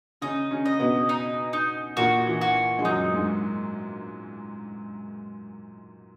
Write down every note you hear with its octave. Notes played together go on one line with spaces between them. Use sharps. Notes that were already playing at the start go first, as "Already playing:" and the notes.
C#3 C#4 D#4
C#3 C#4
D#5
B2 B3
D#4
D#4
A#2 A#3 F#4
E3
F#4
G#3
F#2 F#3 D#4
G#2 G#3